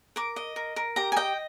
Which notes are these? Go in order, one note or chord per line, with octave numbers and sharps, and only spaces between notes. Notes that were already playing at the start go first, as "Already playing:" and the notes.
A#4 D6
D#5
A#4
A#4
G4 A#5
G#5
D#5 G5